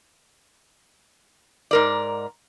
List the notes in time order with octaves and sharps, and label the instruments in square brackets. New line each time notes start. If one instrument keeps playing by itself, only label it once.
[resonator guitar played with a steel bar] G#2 A#4 D5